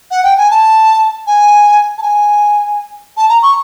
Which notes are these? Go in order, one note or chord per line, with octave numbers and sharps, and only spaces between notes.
F#5
G5
G#5
A5
G#5
A5
G#5
A5
A#5
C#6